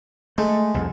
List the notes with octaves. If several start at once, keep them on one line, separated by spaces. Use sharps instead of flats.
G#3 A3
C2 F2